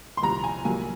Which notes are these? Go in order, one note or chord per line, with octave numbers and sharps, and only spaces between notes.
C6
C2 A#2 F3 A#5
G#5
C2 A#2 F#3 A#3 G#5